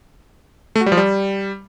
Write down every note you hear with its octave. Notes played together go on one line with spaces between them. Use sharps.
A3
F#4
G3
F3
G3